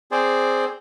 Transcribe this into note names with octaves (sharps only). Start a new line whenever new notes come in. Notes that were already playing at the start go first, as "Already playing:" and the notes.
C4 G#4 C5 D5